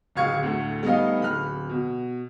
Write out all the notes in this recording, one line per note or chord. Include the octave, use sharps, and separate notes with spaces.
D1 C#2 F5 C#6 G#6 C#7
D2 A2 A3
G3 A3 B3 D#4 D#5 F5
D1 B5 F6
B2